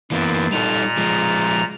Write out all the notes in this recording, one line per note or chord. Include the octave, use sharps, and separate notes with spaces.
F#2 E3 A#3 B3
A#2 G3 D#4 A4 A#5
F3 G#3